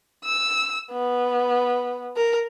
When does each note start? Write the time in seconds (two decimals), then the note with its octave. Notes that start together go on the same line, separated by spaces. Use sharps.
0.25 E6
0.92 B3
2.16 A#4